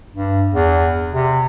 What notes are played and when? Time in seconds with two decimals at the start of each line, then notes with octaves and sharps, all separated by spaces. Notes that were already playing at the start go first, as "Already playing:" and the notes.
0.14 G2
0.53 E2
1.13 C3